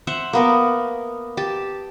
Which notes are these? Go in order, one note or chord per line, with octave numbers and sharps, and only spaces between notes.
C5 E5 F#5
A#3 B3 A#4
G4 A5